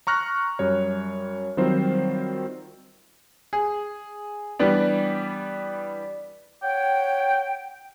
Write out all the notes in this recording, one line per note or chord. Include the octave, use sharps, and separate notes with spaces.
A#5 C#6 F6 F#6 A#6
F#2 G3 C#5
D#3 F#3 G3 C4 F4 C5
G#4
E3 G3 B3 D4
C#5 F#5 G5